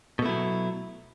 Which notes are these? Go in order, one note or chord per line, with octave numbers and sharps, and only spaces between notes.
B2 F#3 A3 E4